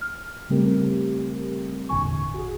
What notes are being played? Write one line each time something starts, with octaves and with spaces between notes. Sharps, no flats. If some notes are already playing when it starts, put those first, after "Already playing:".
F6
C#3 G3 A3 C4 G4 A#4
G#1 E2 A#2 D3 G#5 C#6
F#4 G#4